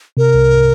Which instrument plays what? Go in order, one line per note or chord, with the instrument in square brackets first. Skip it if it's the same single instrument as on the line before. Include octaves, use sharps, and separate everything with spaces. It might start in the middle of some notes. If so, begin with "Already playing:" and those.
[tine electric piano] C3 [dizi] A#4
[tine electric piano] C2